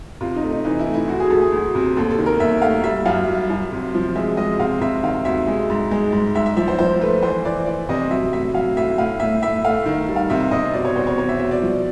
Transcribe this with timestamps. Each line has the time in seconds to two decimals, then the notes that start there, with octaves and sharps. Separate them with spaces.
0.21 C3 F4
0.35 D#4
0.43 A3
0.51 D#4
0.65 E3 D#4
0.79 E4
0.86 A3
0.94 E4
1.08 D2 F#4
1.20 G#4
1.30 D2 A4
1.42 G#4
1.52 D2
1.75 C3
1.96 D#2 A4
2.11 A4
2.18 D#3
2.26 A#4
2.40 D#2 E5
2.62 A3 F5
2.84 G3 E5
3.05 F#2 F5
3.29 G3
3.50 F#2
3.72 C3
3.94 F3
4.16 G#3 E5
4.37 G#3 D#5
4.59 C3 F5
4.81 C3 E5
5.03 D#3 F5
5.25 D2 E5
5.47 G#3
5.70 G#2
5.91 G#3
6.13 G#2
6.35 G#2 E5
6.46 E5
6.56 F3 E5
6.68 C5
6.79 F3 C5
7.01 A3 B4
7.23 E3 C5
7.45 E3 D5
7.66 E3 D5
7.89 C3 D#5
8.10 F#3 E5
8.32 A2 E5
8.54 F#3 F5
8.76 A2 E5
8.98 A2 F5
9.20 A2 E5
9.42 A2 E5
9.64 A3 F5
9.86 D#3
10.09 G3
10.16 F5
10.30 C3 E5
10.51 C3 D#5
10.74 B2 D5
10.85 C#5
10.95 E2 C5
11.07 C#5
11.18 E2 C#5
11.29 E5
11.40 B2 E5
11.51 D5
11.62 F3